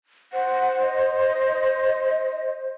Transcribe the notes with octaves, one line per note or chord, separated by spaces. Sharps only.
C5 F#5
D#5